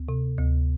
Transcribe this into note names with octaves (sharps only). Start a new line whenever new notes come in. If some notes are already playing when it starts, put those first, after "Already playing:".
Already playing: D2
C3
D2